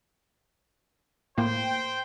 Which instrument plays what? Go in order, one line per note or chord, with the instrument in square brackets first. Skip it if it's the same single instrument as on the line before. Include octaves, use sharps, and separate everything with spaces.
[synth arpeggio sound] A2 A#3 [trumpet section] C5 G5